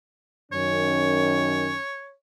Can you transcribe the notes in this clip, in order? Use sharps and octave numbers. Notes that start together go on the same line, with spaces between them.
F#2 D#3 C#4 C#5